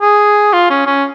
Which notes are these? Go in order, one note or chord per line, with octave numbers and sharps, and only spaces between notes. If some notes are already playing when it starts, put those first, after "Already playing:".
G#4
F4
C#4
C#4